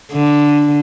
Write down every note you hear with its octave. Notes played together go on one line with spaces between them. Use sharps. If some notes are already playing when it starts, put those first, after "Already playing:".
D3